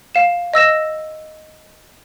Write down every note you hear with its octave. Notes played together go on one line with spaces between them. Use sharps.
F5 E7
D#5 E6 A#6 E7